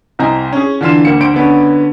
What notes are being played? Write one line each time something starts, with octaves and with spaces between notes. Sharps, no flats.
C2 C4 C5 D#5 G#5 A#5
C#4 G#4
D3 E3 F4 F5 C6 E7
D2 A#3 C#7
D2 C5 D7
D3 B3 C#4